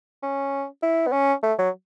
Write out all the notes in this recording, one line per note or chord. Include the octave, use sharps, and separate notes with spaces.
C#4
E4
B3
C#4
A3
F#3